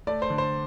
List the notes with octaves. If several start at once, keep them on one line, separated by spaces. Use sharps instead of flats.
A3 D5
C5
D3
C5